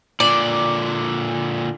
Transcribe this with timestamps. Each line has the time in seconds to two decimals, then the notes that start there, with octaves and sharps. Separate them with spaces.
0.20 A#2 D3 D5